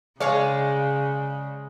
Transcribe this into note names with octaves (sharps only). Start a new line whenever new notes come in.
C#3 G#3 G#4 C#5 D5 F5